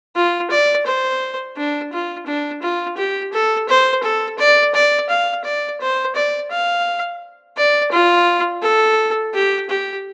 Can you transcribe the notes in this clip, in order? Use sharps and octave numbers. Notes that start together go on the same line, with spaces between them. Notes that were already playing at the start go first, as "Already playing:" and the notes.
F4
D5
C5
D4
F4
D4
F4
G4
A4
C5
A4
D5
D5
F5
D5
C5
D5
F5
D5
F4
A4
G4
G4